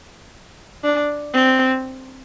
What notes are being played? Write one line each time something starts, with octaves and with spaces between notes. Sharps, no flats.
D4
C4